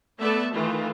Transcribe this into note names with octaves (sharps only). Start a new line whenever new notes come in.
A3 B3 A4 D5 E5 A5
D#3 E3 A3 F4